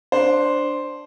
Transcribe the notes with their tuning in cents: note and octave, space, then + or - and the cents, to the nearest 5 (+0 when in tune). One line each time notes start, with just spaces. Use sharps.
D4 +0 C5 +0